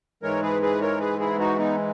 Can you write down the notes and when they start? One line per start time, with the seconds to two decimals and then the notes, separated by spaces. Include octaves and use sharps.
0.23 G#2 E3 G#3 A#4 C#5
0.42 G#4 B4
0.62 G#4 B4
0.81 A#4 C#5
1.00 G#4 B4
1.19 E4 G#4
1.39 D#4 F#4
1.58 B3 D#4